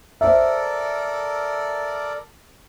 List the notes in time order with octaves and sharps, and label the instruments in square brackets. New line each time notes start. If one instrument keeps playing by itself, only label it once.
[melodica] A4 A#4 D5 [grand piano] C5 E5